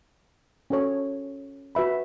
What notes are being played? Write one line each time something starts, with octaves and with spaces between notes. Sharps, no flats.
C#4 F#4 A4 C#5
F#4 B4 E5 B5